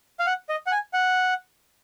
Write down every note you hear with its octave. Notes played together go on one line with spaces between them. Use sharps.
F5
F#5
D#5
F#5
G#5
F#5